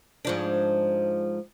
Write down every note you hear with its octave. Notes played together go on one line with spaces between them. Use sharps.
G#2 F3 D4